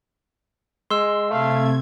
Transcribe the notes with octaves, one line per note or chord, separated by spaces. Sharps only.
G#3 C6 E6
C3 A3 F5 G#6